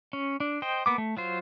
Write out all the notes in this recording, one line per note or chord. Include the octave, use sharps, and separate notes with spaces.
C#4
D4
C5 D#5 G5
A#3 B3 D6
A3
F#3 F4 C5